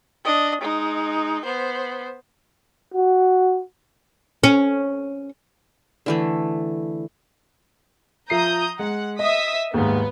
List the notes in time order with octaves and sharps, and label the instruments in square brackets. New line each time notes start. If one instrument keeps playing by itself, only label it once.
[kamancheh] D4 D#5
G#3 D#4
B3 C5
[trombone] F#4
[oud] C#4
[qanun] D3 E3 A3
[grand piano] F3 E5 C7 [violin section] A#5 D#6 G6
[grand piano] G#3 [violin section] F#5
[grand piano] D#5 [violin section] E5 D#6 B6
[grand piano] D#2 G#2 [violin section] B3